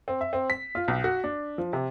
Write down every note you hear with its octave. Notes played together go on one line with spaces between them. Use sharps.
C4
E5
C4
B6
F4
B1
F#4
D4
F3
C3